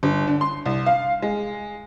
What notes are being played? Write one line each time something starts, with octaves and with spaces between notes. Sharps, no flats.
G1
D3
C6
C2
F5
G#3